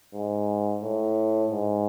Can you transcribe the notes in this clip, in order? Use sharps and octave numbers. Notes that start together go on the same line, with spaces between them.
G#2
A2
G#2